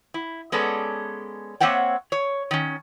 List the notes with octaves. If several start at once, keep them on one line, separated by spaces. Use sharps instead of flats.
E4
G#3 B3 C#4 A4 D5
A#3 C4 C#5 E5 F#5 G5
C#5
D#3 C#4